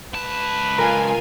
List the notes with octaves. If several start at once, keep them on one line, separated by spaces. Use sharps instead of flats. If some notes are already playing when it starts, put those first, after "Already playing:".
C#2 B4 A5
F4 A#4 G#5